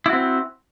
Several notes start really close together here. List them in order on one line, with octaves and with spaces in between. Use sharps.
E4 F#4 C4